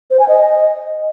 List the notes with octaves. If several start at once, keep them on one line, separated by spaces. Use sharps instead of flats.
C5
G#5
D#5